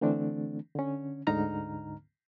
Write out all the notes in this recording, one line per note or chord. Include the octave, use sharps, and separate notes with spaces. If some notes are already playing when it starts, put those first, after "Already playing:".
D3 E3 A3 C4 D4
D3 C#4
D2 G#2 D3 D#4 A#5 F6